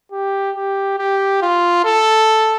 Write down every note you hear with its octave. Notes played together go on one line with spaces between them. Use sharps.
G4
G4
G4
F4
A4